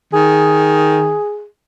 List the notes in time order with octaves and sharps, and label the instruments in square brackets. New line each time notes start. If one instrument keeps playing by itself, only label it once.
[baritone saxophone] D#3 [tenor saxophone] G#4